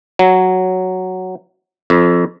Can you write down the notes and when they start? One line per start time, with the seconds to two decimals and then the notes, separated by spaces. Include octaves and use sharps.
0.19 F#3
1.90 F2